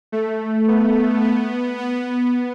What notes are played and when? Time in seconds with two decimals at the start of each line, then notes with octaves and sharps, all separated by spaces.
0.12 A3
0.68 B3
1.22 B3
1.77 B3